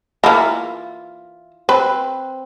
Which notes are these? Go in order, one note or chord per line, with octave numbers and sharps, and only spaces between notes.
E3 A#3 F4 E5
C4 B4